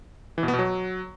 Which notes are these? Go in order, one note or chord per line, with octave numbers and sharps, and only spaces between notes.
E3
B2
B3
B2
F#3